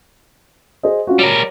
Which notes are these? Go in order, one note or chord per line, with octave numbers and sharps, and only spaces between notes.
G#4 C5 D#5
C#4 F4 F#4
G3 A#4 C#5